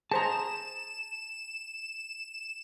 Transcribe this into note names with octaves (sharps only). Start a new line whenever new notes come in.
G#4 C5 A5 A#5 E7